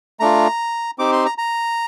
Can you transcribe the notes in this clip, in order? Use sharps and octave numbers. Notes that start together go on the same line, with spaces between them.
A3 D4 F4 A#5
C4 D#4 G4 D6
C6
A#5
A#5